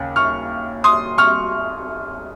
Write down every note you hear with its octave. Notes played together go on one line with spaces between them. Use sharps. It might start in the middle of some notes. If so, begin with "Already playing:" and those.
Already playing: D#2 C#3 C#4
C#6 F6
C6 D#6
C#6 F6